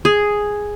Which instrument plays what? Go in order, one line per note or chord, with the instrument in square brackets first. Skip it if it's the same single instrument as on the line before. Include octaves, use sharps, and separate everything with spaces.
[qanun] G#4